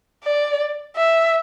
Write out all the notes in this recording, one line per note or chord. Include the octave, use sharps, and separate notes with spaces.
D5
E5